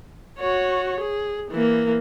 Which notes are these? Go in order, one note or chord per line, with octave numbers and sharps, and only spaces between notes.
F#4 C#5
G#4
E3 A#3